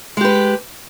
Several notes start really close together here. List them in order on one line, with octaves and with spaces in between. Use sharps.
G#3 G4 B4